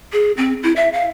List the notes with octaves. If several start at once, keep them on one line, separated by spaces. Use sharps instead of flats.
G#4
C4
E4
E5
F5